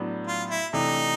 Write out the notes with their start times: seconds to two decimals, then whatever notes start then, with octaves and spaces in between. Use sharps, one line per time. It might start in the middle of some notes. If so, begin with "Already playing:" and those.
Already playing: A2 F#3 B3 D4
0.27 F4
0.50 E4
0.73 C3 E3 A3 D4 D#4